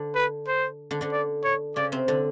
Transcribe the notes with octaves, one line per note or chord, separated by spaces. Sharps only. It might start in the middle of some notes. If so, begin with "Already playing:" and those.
Already playing: D3 D4
B4
C5
D3 D4
D3 D4
D5
C#5
C#3 C#4 D5
C3 C4
D3 D4